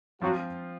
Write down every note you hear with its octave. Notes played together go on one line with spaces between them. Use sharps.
F3 F#3 C4 F4 F#4